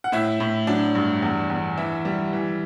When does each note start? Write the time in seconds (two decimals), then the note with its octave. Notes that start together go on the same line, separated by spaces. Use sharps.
0.04 F#5
0.12 A2 E4 E5
0.40 A2
0.67 F#3 D4 D5
0.95 G2
1.22 E2
1.50 E2
1.77 E3 E4 E5
2.05 G3
2.33 E3